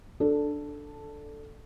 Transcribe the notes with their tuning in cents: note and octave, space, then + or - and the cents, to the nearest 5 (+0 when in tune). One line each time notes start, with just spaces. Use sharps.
D4 +0 A4 +0